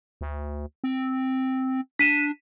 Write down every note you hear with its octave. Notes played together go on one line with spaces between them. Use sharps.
D2
C4
D4 B6 D#7 E7